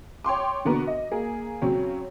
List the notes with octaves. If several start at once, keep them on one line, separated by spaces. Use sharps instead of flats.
C#5 G5 C6 D6
B2 D3 B3 F#4 A#4
D#5
A#3 G#4
C#3 F#3 C4 C#4